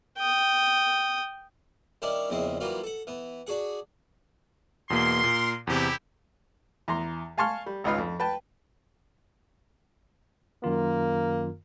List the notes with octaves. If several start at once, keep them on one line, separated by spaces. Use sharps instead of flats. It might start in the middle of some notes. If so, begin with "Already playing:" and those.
G5 D#6
D#3 G3 C#4 D4 E4 D5
A#1 E2 C#3 C4 E4 D#5
E3 F#3 G3 A#3 F4 F#4
A4 F#5
E3 B3
D4 F#4 G#4 F#5
E2 B2 A#3 A#4 C6
A#2
E2 C3 E4 G4
E2 A#5 C6
F5 G#5 A5 C6 C#6 F6
G3
G#1 C#2 D#4 F4 B4 F5
F2
B4 G5 A5
F#2 D#3 A#3 F4